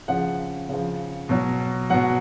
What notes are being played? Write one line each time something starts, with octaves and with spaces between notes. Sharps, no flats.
C#3 F3 F#5
C#3 F3
B2 F#3
B2 F#3 F#5